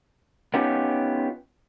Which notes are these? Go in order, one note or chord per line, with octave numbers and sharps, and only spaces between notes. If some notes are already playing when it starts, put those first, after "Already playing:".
B3 C#4 D#4 F4 G4